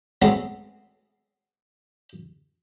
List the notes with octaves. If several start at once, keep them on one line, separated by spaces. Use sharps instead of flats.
F#3 G#3 A3 B3 C4